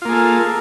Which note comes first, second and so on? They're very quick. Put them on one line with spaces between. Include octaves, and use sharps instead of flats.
F4 A#3 G#4 A4